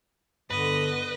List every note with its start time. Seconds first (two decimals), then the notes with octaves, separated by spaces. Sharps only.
0.50 G2 D3 B3 B4 D#5